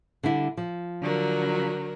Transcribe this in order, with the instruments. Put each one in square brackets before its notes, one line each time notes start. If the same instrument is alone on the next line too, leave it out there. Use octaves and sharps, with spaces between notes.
[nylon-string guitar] D3 G3 E4
F3
[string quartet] D3 F#3 A#4